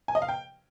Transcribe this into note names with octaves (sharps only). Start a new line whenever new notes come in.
G#5
D#5
F5
G5